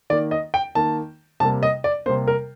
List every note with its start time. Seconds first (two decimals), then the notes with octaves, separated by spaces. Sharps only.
0.10 D#3 D5
0.13 A#3
0.31 D#5
0.54 G5
0.75 D#3 A#3 A5
1.40 C3 G3 A#3 A5
1.63 D#5
1.84 D5
2.06 C3 G3 A#3 C5
2.28 A#4